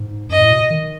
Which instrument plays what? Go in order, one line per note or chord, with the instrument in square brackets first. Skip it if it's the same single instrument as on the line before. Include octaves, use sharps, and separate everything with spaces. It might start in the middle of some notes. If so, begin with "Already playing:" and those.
Already playing: [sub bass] G#2
[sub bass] F#2 [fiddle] D#5
[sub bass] A2
B2
D#3